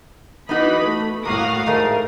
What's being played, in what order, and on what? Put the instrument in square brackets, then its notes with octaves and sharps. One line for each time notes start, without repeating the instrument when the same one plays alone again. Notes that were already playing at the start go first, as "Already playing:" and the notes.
[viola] E3 D#5 [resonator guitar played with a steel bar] B3 D#4 F#4 [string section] B5
[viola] A3
[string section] A2 F5 D#6 [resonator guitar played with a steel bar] A#3 [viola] F#4
[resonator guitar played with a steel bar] G#2 A3 G#4 [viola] A#4